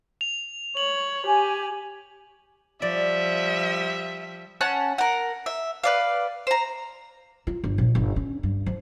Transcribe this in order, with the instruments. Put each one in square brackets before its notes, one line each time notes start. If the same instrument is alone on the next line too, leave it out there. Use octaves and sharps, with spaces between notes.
[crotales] F7
[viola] C#5 [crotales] F#7
[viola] G4 [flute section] G#5
[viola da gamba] F3 G3 [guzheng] D5 [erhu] E5
[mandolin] C#4 F#5 A5 F#6
A#4 F#5
E5
B4 D5 F5
C5 A#5
[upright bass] F4
G1
A#1
G1
C#4
G2
F3